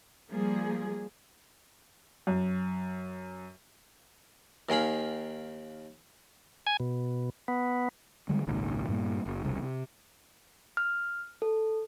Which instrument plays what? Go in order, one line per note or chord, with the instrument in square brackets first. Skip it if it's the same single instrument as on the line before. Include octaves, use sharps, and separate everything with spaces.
[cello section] F3 G3 A#3 G#4
[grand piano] F#2
[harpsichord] D#2 D#3 G#4 F5 B5
[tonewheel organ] G#5
B2
B3
[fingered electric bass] D3 G3 G#3
G#1 C#2 A#2 D#3
G2 A#2 G3 A#3
F#1
E1 C2 C#3
C3
[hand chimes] F6
A4